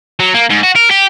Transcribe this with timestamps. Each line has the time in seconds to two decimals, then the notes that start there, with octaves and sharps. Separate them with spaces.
0.20 F#3
0.34 A#3
0.50 G#2
0.63 F#4
0.75 A#4
0.90 G4